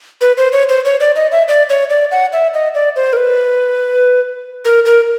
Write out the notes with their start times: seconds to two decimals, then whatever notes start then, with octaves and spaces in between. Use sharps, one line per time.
0.21 B4
0.37 C5
0.52 C#5
0.69 C5
0.85 C#5
1.00 D5
1.16 D#5
1.32 E5
1.48 D5
1.69 C#5
1.90 D5
2.11 F#5
2.33 E5
2.54 D#5
2.75 D5
2.96 C5
3.13 A#4
3.17 B4
4.65 A#4
4.85 A#4